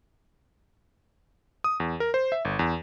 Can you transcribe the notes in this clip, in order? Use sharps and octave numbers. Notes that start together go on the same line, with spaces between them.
D#6
E2
A#4
C5
E5
G1
E2